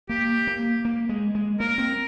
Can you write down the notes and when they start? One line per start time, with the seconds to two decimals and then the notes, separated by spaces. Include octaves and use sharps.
0.09 A#3 G4
0.47 A#3
0.85 A#3
1.09 G#3
1.35 G#3
1.60 A#3 A#4
1.78 C4